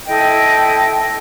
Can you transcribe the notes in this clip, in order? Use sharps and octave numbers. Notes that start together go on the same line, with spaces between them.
E4 A4 D#5 G5